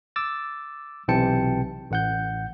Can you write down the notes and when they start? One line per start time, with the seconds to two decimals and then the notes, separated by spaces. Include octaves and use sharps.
0.16 D6 E6 A6
1.08 B1 C3 E3 G5 A5 C#7
1.91 A1 F#5 G6